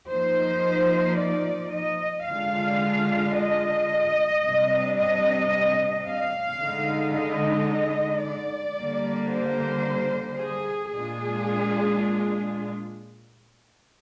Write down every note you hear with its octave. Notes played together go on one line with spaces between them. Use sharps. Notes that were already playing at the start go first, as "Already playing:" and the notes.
F3 A#3 D#4 C5
D5
D#5
D3 G#3 D4 F4 F5
D#5
C3 G3 D4
D#5
F5
D3 G#3 D#4
D#5
D5
D3 G3 A#3
C5
G#4
A#2 G#3 D4 F4 G#4